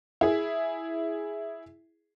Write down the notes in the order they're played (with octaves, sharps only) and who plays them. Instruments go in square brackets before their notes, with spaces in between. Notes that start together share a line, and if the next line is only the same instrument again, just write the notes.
[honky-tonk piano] E4 G#4